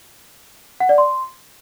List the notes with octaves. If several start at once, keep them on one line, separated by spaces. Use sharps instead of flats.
F#5
D5
C6